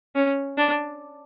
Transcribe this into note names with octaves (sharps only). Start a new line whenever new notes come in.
C#4
D4